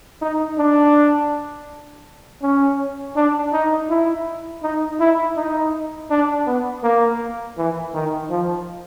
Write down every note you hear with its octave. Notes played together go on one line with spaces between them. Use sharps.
D#4
D4
C#4
D4
D#4
E4
D#4
E4
D#4
D4
B3
A#3
E3
D#3
F3